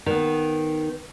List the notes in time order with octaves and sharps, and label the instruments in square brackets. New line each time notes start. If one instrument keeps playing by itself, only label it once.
[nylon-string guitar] D#3 B3